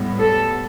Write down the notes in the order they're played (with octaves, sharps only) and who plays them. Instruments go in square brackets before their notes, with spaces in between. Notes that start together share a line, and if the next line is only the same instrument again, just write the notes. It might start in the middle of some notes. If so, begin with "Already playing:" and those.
Already playing: [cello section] A2 G3 B3
A4